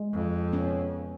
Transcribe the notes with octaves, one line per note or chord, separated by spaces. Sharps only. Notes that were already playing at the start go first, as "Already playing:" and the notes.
Already playing: G#3
F2
B3 C#4